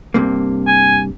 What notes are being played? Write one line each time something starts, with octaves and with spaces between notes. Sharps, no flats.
G2 C3 A#3
G#5